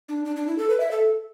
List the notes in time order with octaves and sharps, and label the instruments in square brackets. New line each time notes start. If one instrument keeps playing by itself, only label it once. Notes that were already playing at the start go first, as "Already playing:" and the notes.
[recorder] D4
D4
D4
E4
A4
B4
E5
A4